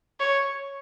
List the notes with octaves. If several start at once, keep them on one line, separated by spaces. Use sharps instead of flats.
C#5